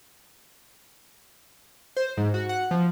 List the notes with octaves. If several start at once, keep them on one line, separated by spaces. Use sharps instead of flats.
C5
G#2
F#4
F#5
F3